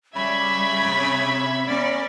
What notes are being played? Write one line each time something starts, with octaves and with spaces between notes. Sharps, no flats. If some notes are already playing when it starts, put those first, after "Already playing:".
C#3 G3 E5 B5 G#6
C3
B3 C#4 A#4 D5